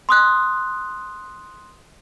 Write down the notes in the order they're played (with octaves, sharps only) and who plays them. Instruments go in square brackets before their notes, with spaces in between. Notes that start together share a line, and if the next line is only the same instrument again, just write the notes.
[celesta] C6 D#6 F#6